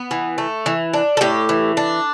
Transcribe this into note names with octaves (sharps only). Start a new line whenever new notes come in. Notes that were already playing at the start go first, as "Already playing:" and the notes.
Already playing: B3
E3
A3
E3
D4
A4
A2 G4
E3
D4